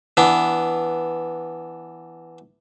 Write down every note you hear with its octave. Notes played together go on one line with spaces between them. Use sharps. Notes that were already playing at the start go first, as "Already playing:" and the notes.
E3 B3 D4